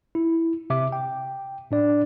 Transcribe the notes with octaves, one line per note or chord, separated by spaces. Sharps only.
E4
C3 E5 D6
G5
A2 D4 D5